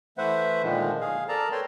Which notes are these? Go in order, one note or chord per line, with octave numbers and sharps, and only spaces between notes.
E3 A3 B4 C5 E5 F#5
A#2 D3 D#3 F3 G#3
G#4 F5
A4 A#4 D5 A5 A#5
A4 B4 C#5 G5 C6